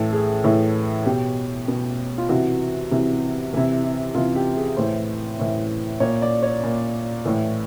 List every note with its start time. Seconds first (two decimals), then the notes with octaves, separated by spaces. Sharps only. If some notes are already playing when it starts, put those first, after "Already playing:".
Already playing: A2 E3 A4
0.13 G#4
0.44 A2 E3
1.05 B2 G4
1.68 B2
2.18 F4
2.29 C3 E3 F#4
2.91 C3 E3
3.53 C3 E3 E4
3.84 E4
4.15 C3 E3 F4
4.36 G4
4.57 G#4
4.77 A2 E3 C5
5.39 A2 E3
6.00 A#2 C#5
6.22 D5
6.42 C#5
6.63 A#2
7.25 A2 E3